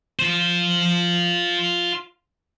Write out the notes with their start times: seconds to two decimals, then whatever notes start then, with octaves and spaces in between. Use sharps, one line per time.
0.19 F4 C5